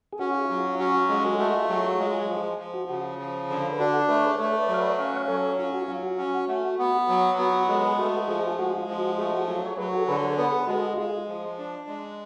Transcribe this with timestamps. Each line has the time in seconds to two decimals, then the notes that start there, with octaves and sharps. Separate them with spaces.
0.13 G#4
0.19 C#4 F#4
0.34 F4 G#4
0.50 F#3 F4
0.64 F4
0.79 C#4 F#4
0.94 F#4
1.09 G#3 F4 G#4
1.24 F#4 A4
1.39 A3 F#4 A4
1.54 F4 G#4
1.69 F#3 F#4
1.84 F4 G#4
2.00 G#3
2.29 F3
2.58 F3
2.74 F#4
2.89 C#3 F#4
3.19 F3
3.49 D3
3.72 B4
3.78 D4 F#4 A4
4.08 A3 B4
4.17 C#5
4.24 G#4 B4
4.34 B4
4.38 A3 A4 C#5
4.58 B4 D5
4.68 F#3
4.74 F5
4.78 B4 D5
4.98 C#4 F5
5.08 F#5
5.17 C#5 F5
5.28 F#3 A4 C#5
5.58 C#4 F4
5.73 F#4
5.88 F#3 F4
6.03 F#4
6.18 C#4
6.48 A3
6.78 B3
7.09 F#3
7.38 B3 F#4
7.53 F#4
7.68 G#3 F#4 A4
7.83 G#4 B4
7.98 A3 F#4 A4
8.28 F3 F4 G#4
8.47 G#4
8.58 G#3 F#4
8.78 F4
8.88 F3
8.98 F#4
9.18 A3 F4 G#4
9.33 F#4
9.48 F#3 F4 G#4
9.66 C#5
9.77 F#3 G#4 B4
9.93 F#4 A4
10.08 D3 G#4 B4
10.23 A4 C#5
10.38 B3 B4
10.45 A4
10.52 G#4 B4
10.67 G#3 F#4 A4
10.94 F#4
10.97 G#3 F4 G#4
11.28 F3
11.58 D4
11.87 G#3